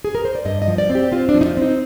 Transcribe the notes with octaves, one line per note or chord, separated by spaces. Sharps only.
G#4
A#4
C5
D5
G2 D#5
D#5
F3
D5
C4
G4
C4 F4
D4
F3
D#4
F4
C4 D#4